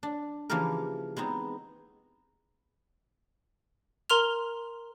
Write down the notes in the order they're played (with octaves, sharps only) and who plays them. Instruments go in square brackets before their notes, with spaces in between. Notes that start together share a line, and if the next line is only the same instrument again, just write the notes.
[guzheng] D4
C#3 E3 F3 A#3 G4 A#4
G#3 B3 C4 D#4
[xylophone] A#4 A#5 C6 F6 F7